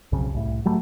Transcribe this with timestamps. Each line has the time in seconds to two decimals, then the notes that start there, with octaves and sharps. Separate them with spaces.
0.12 B1 F2 C#3
0.34 C2 A2
0.65 F#3 G3 A3